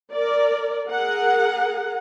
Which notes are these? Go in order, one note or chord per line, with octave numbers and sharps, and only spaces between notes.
A#4 D5
G#4 A#4 F#5